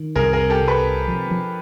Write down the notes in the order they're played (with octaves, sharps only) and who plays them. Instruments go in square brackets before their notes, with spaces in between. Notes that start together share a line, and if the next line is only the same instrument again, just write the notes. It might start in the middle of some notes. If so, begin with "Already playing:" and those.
Already playing: [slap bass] D#3
[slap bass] C2 [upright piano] G#4 A#4
[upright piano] G#4 A#4
[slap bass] C3
[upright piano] G4 A4
[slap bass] C2
[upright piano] A4 B4
[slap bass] C3
F3
F3